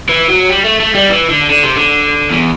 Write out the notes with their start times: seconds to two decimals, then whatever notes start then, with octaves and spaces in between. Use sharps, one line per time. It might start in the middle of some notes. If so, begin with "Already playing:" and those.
0.09 E3
0.29 F#3
0.49 G3
0.65 A3
0.80 A3
0.95 G3
1.10 E3
1.30 D3
1.50 D3
1.63 C3
1.76 D3
2.31 E2